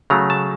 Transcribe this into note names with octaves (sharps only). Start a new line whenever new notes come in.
C#3 F#3 A3 A#5
A5